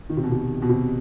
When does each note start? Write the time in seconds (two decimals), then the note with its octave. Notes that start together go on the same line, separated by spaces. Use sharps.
0.09 D#3
0.17 C3
0.23 B2
0.31 C3
0.62 B2
0.69 C3